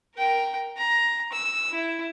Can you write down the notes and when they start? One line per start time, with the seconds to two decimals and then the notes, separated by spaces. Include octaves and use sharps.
0.15 A#4 G5
0.77 A#5
1.32 E6
1.70 E4